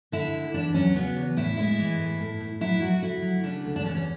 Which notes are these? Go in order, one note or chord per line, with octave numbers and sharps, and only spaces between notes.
D3 E4
D2
E2 D4
F#3 C#4
C#3 B3
E2
A2 E4
G#3 E4
E3
A2
A2
A2
F#3 E4
F#3 F#4
D2 E4
F#3
C#3 D4
D2
D4
E2 C#4
C#4